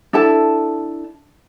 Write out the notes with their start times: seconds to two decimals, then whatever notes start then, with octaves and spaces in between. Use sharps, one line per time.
0.13 D4 E4 A4 A5